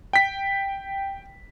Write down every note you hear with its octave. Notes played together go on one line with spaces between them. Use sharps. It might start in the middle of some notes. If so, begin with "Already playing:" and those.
G5 B6